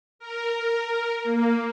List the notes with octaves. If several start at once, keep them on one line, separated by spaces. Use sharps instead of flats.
A#4
A#3